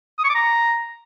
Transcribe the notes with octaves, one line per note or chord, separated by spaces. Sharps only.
D#6
C#6
D6
A#5